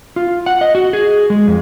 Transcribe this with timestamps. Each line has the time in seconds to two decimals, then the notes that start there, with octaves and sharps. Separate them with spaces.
0.16 F4
0.46 F#5
0.61 D#5
0.75 F#4
0.93 G#4
1.30 G#3
1.47 F2